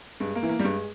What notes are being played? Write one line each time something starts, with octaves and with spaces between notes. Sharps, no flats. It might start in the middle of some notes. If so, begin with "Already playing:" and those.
G2 G#3
A#3
E3
A#3
G3
G2 G#3